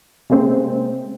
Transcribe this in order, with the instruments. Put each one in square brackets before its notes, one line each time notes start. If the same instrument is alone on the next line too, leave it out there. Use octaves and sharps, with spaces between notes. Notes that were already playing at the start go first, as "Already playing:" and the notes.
[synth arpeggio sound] C3 G#3 A#3 C4 C#4